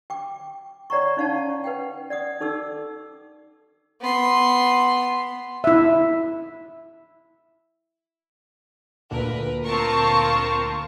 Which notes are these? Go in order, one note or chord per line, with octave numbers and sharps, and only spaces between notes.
G5 D6
C#5 D5 F#5 A#5 C#6
C#4 D#4 F5 F#5 A5
B4 F#5 G5
D5 F#5 D#6
D#4 A4 D6 E6
B3 C6
E4 E5
D2 A#2 D3 A#4 B4
C4 F4 A#4 A5 C#6